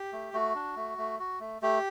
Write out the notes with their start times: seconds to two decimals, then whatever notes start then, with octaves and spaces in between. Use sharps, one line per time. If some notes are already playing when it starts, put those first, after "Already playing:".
Already playing: G4
0.13 A3
0.33 A3 F#4
0.55 D4
0.76 A3
0.98 A3
1.20 F#4
1.40 A3
1.62 A3 G4